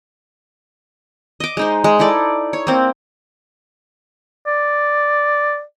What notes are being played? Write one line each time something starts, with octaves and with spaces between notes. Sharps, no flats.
D#5 D6
G#3 D#4 C5
G#3
D#4 E4 A4 D5
C#5
A#3 C4
D5